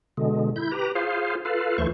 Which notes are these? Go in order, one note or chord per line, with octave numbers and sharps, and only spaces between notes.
B2 D3 G#3
E4 G6
G4 B4 A#5
F4 G#4 C5 F5
F4 A4 B4 F5
D2 E3 A3 F4 C5 C#6